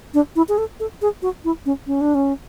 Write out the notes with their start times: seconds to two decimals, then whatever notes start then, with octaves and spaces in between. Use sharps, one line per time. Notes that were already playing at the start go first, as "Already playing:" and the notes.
0.14 D4
0.36 E4
0.49 G#4
0.58 A4
0.80 A4
1.02 G#4
1.22 F#4
1.44 E4
1.66 C#4
1.87 C#4
2.01 D4
2.15 C#4